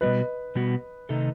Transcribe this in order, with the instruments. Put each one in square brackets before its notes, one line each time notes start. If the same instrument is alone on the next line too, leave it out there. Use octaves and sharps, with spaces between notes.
[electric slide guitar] B2 G3 B3 F#4 [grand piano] B4 D#5
[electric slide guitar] B2 G3 B3 F#4
C3 D#3 A3 D#4 A4